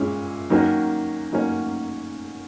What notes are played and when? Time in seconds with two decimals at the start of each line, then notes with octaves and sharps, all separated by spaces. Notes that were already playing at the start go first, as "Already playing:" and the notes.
Already playing: A#2 G#3 C#4 E4
0.50 D#3 F#3 A#3 C#4
1.32 D#3 F#3 A#3 C#4